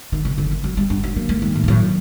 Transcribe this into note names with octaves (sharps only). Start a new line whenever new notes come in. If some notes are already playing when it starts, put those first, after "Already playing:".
G1 D#3
C3
G1 D3
D#3
D3 F#3
G3
G2 D4
F#3
F#3 A#3
A3
D#3 G3
A2
G2
A2 F#3